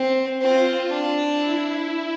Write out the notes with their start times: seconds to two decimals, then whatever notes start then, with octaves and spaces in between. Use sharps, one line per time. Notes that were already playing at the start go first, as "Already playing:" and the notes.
Already playing: C4
0.41 C4 F4
0.90 D4
1.39 E4